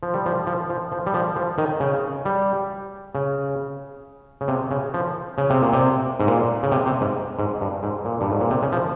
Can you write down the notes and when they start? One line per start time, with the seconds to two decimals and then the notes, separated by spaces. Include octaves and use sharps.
0.03 F3
0.14 G3
0.26 F3
0.47 F3
0.70 F3
0.92 F3
1.06 G3
1.14 F3
1.36 F3
1.58 D#3
1.80 C#3
2.25 G3
3.15 C#3
4.41 C#3
4.48 C3
4.71 C#3
4.94 F3
5.38 C#3
5.50 C3
5.62 A#2
5.73 C3
6.20 G#2
6.27 A#2
6.63 C#3
6.72 C3
6.86 C3
7.01 G#2
7.39 G#2
7.61 G2
7.83 G#2
8.05 A#2
8.21 G2
8.30 G#2
8.40 A#2
8.50 C3
8.62 C#3
8.72 F3